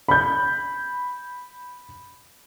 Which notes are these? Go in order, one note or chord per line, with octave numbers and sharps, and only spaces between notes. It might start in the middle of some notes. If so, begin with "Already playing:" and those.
B5 G6